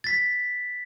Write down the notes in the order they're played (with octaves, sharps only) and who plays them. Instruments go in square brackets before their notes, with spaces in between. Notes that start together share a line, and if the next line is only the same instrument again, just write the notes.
[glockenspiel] A6 B6